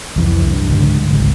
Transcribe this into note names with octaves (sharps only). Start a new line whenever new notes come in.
C2 F2 E3
G2
C#2 G#2 D3 G3
G#1 C#2